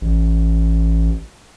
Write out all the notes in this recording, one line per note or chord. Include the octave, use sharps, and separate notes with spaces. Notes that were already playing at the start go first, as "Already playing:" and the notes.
A1